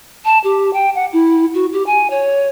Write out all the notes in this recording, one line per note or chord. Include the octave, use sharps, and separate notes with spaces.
A5
G4
G5
F#5
E4
F#4
G4
G#5
C#5